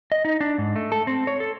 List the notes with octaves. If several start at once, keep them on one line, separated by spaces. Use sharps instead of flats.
D#5
D#4
D4
G#2
A3
A4
C4
C#5
A4